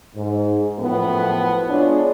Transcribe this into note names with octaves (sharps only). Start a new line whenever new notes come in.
G#2
F#2 A2 F3 B3
G#3 D4 F4 G#4 C#5